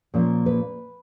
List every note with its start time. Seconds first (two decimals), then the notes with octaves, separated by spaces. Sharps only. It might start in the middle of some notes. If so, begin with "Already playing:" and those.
0.14 A#2 F3 A#3 C#4
0.46 B4